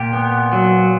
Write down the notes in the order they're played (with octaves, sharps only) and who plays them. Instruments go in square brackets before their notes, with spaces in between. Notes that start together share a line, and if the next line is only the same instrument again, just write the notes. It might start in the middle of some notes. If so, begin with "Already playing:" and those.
Already playing: [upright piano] A#2 [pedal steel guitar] G4
[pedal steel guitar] B3
F#3